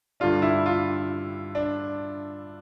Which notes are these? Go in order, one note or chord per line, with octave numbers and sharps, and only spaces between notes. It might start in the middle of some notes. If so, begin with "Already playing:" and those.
G2 D3 G3 D4 F4
E4
F4
D4